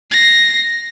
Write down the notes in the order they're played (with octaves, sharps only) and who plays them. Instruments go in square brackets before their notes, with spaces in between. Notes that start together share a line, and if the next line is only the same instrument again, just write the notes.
[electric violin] A#6 C7